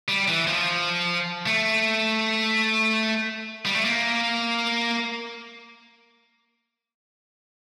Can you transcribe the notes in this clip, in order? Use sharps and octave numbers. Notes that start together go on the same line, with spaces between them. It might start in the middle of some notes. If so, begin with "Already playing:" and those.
G3
E3
F3
A3
G3
A3
A#3